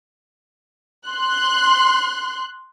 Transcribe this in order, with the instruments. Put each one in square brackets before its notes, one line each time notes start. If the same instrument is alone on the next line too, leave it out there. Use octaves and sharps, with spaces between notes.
[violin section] C6 F#6